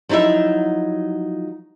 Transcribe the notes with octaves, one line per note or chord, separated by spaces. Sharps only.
F3 F#3 D#4 E4 E5